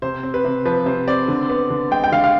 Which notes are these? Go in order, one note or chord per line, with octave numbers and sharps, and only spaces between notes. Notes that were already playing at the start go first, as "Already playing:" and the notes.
C3 C5
C4
B4
C3
F3 B4
C3 C5
C4 D5
D3
B3
D3
G#3 G5
G5
D3 F5
F5